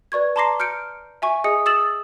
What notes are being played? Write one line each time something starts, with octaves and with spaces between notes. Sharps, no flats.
B4 D5 C#6 G#6
A5 A#5 C6 D6 A#6 C7
F6 G6 C#7 D7
E5 G#5 C#6
G#4 D#5 G#5 D#6 C#7
D#6 E6 A6 E7 F#7